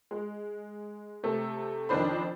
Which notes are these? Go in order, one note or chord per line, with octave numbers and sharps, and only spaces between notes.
G#3
C3 A3 A4
F2 D#3 C#4 D4 C5 B5